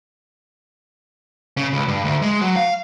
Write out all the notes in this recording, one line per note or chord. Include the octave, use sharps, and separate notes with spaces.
C#3
C#2
G2
D2
G#3
F#3
F5